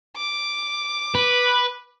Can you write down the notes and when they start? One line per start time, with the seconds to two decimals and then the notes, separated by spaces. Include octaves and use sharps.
0.17 D6
1.15 B4